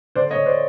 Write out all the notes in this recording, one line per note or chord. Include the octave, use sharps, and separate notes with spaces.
D3 C5 D5
C#5 D#5
D3
C5 D5